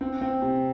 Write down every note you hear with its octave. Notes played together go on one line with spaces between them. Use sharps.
C4
C4
C3